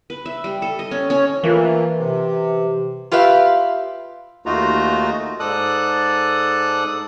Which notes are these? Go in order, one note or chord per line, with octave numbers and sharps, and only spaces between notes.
B4
E5
G3
A4
D#5
C#4
C#4
E3 A3 A#3 F4
C3
F4 G4 B4 E5 F5
D#2 A3 D#4 F4 F#4 A#5
G#2 A4 D5 D#6 F#6